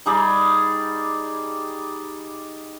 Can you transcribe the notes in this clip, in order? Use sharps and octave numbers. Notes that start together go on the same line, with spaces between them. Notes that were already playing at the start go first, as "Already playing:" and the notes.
G3 D#4 G#4 D5